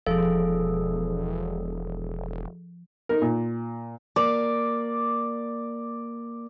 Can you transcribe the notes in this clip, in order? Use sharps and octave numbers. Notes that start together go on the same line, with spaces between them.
E1 F3 G#4 A4
D#4 A#4
A#2
A#3 D5